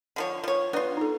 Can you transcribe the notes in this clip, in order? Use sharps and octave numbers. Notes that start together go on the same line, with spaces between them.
D3 F3 C#5
F3 C#5
B3 D4 F4 B4 D5
D#4 A4